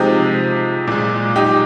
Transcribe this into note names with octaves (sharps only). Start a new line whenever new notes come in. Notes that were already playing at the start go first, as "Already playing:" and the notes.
Already playing: C3 F3 G#3 D#4 G4
A#2 G#3
D#4 G4